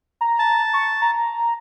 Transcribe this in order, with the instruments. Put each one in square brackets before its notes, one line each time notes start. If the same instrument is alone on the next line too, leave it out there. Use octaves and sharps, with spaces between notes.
[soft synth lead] A#5
[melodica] A5
[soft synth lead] C#6
A#5